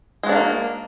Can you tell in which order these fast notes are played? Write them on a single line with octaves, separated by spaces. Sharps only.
G#3 F#4 D4 G3 A#3